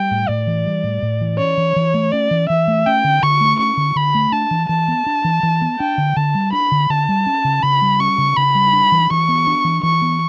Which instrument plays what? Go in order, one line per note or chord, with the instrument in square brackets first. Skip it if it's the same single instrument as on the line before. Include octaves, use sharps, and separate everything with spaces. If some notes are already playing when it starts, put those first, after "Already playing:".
Already playing: [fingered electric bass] G3 [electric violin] G5
[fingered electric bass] A2
[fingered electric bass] A2 [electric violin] D5
[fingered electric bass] E3
G3
A2
A2
E3
[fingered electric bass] C#4 [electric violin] C#5
[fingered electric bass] E3
E3
A3
[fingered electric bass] C#4 [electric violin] D5
[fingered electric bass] E3
[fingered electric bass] E3 [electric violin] E5
[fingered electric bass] A3
[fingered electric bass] C#4 [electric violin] G5
[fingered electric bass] D3
[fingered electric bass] D3 [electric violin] C#6
[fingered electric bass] A3
[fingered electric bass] C#4 [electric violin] C#6
[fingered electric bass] D3
[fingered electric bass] D3 [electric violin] B5
[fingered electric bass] A3
[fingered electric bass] D4 [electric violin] A5
[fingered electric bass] E3
[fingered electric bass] E3 [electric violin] A5
[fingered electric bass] B3
D4
E3
E3
B3
[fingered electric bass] D4 [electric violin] G5
[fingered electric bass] D3
[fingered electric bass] D3 [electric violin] A5
[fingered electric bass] G3
[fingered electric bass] D4 [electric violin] B5
[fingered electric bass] D3
[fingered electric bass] D3 [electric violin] A5
[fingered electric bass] G3
C#4
C#3
[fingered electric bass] C#3 [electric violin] B5
[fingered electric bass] G3
[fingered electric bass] C#4 [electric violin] C#6
[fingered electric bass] C#3
[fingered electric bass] C#3 [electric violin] B5
[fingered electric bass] G3
D4
E3
[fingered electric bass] E3 [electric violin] C#6
[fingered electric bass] B3
D4
E3
[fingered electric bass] E3 [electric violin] C#6
[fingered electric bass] B3